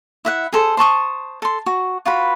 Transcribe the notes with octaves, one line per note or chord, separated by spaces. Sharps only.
E4 E5 F#5
G#4 A4 C5
C5 A5 C#6 D#6
A4 C6
F#4
F4 F#4 B4 B5